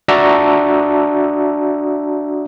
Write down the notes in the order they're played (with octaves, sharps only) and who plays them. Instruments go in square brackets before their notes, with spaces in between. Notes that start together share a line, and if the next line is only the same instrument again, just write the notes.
[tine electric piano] D4 F#4 D5 E5 A5 A#5